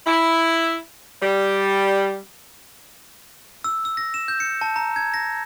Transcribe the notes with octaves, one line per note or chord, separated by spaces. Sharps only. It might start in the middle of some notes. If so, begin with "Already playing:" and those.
E4
G3
E6
E6
A#6
E7
G6
C#7
A5
A#5
G#6
A#6